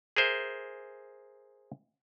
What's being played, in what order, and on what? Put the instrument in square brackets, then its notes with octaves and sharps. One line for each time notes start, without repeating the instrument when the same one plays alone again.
[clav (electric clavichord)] G#4 A#4 C5 E5